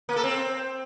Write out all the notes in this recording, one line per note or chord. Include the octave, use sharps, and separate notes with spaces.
A#3
A4
C4